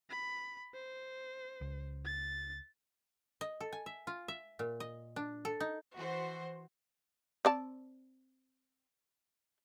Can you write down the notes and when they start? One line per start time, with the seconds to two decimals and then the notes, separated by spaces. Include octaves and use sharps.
0.10 B5
0.74 C5
1.61 C#2
2.05 A6
3.41 D#5
3.61 A4
3.72 G#5
3.86 E5
4.07 F4
4.28 E5
4.59 A#2
4.80 D#5
5.16 D4
5.45 A4
5.60 D#4
5.95 E3 F#4 C5
7.45 C4 D5 A5